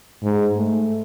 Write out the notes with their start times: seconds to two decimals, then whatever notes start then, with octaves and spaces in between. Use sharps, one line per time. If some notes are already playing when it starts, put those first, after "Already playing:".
0.23 G#2
0.57 A3